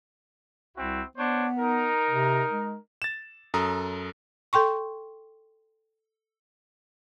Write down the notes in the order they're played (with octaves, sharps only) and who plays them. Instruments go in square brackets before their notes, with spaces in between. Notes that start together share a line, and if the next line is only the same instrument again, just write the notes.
[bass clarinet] C2 [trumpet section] C4 E4 F#4
[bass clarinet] B3 [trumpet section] D4 C5 C#5
[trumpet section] D#4 A#4
[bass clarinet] C3
G#3
[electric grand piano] A6 E7
F#2 A4 A#5 D#6
[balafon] A4 G5 C6 C#6